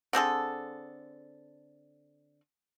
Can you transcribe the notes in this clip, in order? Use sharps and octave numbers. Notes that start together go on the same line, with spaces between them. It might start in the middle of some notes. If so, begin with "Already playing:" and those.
D3 C4 G#4 A4